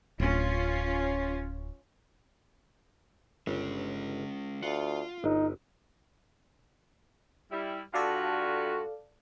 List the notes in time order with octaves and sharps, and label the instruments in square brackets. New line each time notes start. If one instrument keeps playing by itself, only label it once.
[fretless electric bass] D1 [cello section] C#4 F4
[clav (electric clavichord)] G1 [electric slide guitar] G#3 C#4
[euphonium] D2 [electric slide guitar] F4 [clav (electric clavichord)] F#5
[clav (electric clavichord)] G1 [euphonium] D#4
[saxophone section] G3 E4
[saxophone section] G2 F4 F#4 [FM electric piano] A4 D5 F5